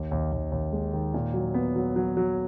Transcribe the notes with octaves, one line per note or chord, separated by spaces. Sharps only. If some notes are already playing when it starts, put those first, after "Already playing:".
Already playing: D#2
D#2
D#2
D#2
G#3
D#3
A#2
F#3
B3
F#3
F#3
F#3